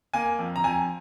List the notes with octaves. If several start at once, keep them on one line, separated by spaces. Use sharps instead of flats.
A#3 G#5
F2
A#5
F2 G#5